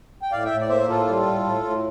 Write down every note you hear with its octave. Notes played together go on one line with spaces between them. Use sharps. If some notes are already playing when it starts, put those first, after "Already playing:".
G5
A2 D5 F5
E5 G5
A2
D5
A#3 C5 E5
A2 F4 A4
G3
A2
A2
A2